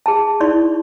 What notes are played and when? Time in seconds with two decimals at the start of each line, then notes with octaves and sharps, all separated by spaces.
0.06 G#4 A5
0.40 D#4 E4 D5 C6 C#6